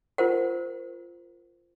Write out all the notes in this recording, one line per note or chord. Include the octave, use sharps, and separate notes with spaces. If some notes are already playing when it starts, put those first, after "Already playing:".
F4 A#4 C5 F#5